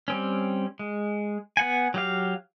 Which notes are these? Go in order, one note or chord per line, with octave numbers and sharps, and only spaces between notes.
G3 C4 C#4
G#3
B3 F#5 G#5
F#3 G4 F5